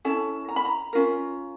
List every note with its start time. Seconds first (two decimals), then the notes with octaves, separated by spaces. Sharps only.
0.05 C#4 E4 A4 A5
0.49 A#5
0.56 B5
0.65 A#5
0.93 C#4 F4 A#4